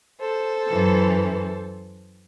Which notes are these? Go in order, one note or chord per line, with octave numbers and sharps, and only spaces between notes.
A4 C5
F#2 E3